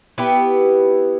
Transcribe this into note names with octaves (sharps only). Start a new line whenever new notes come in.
B3 E4 G4 B4